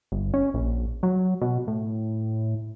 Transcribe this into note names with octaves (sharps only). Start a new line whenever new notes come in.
G1
C#4
A#1
F#3
B2
A2